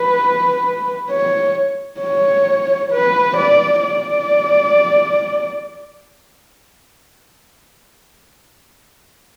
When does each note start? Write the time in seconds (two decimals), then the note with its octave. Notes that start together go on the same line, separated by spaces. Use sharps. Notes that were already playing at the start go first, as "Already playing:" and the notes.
Already playing: B4
1.10 C#5
2.01 C#5
2.92 B4
3.37 D5
3.83 D5